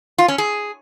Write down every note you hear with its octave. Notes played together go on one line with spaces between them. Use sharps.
F4
C#4
G#4